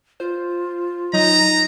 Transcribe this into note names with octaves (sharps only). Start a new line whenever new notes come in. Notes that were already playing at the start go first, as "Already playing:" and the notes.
F4 C5
F#3 D#4 A#5